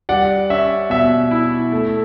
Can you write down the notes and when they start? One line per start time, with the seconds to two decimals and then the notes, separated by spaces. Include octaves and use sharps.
0.09 G3 D5 F#5
0.50 C#4 E5
0.90 B2 E5
1.31 E4
1.72 A3